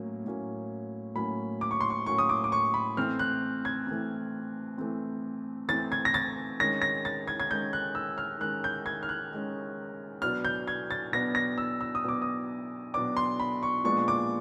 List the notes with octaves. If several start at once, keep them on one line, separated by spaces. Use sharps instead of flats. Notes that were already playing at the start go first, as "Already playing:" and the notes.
Already playing: A2 F#3 A#3 C#4
A2 F#3 A#3 C#4
A2 F#3 A#3 C#4 B5
D6
C#6
C6
C#6
A2 F#3 A#3 C#4 C#6
D#6
D6
D6
C#6
B5
E3 A3 C4 F6
F#6
G#6
E3 A3 C4
E3 A3 C4
E3 A3 C4 A6
G#6
A#6
A6
D#3 G#3 C#4 A#6
A#6
A6
G#6
G#6
D#3 G#3 C#4 G6
F#6
E6
F6
D#3 G#3 C#4 F#6
G6
G#6
F6
F#6
D#3 G#3 C#4
B2 F#3 B3 D4 F6
G6
G#6
A6
B2 F#3 B3 D4 A#6
A#6
E6
E6
D#6
B2 F#3 B3 D4 D6
D#6
B2 F#3 B3 D4 D6
C6
B5
C#6
A#2 F3 G#3 B3 D4 C#6
D6